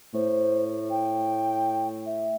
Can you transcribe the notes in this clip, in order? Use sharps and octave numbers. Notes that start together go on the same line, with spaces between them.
A2 C5
G5
E5